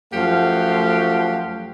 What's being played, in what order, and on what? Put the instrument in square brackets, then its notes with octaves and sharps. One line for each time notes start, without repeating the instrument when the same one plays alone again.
[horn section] F#2 F3 A3 G4 F5 F#5